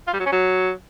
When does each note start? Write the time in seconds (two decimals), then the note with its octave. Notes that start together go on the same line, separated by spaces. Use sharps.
0.07 F4
0.13 G3
0.20 F#3
0.26 C#4
0.32 F#3